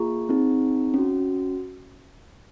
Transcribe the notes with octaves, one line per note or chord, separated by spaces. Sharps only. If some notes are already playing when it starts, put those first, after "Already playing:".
Already playing: A#3 F4 G#4 A#5 C#6
C4 D#4 G#4
C#4 F#4